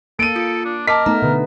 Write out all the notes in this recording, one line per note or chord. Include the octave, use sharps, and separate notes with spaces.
A#3 A4 D7 D#7
F4 D#6 C#7
D4
A#4 D#5 A5 D6 B6
A3 B3 D#4 A#5
B2 D3 B3